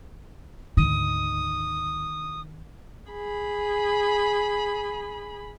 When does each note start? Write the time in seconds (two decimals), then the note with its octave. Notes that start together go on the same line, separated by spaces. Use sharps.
0.77 D2 G#2 D3 D#3 D#6
3.11 G#4 B5